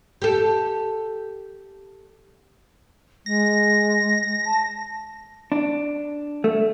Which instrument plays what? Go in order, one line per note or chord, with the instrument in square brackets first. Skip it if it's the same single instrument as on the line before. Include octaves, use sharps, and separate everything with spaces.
[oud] G4 A4
[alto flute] G#3 [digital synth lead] A#6
[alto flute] A5
[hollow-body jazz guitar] D4
A3